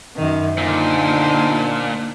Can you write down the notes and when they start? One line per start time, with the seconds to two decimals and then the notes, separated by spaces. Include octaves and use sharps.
0.16 F#2 D#3
0.58 A#2 D3 D#4 C5